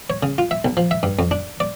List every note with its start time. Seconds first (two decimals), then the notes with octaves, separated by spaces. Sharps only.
0.10 C#5
0.23 C#3
0.38 F4
0.51 E5
0.65 B1
0.77 F3
0.91 E5
1.03 G2
1.19 F2
1.31 D4
1.60 D5